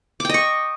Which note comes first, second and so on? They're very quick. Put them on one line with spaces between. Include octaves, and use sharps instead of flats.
D6 G5 D#5 C#6